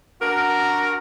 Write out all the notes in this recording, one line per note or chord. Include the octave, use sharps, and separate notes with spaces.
D4 F#4 A#4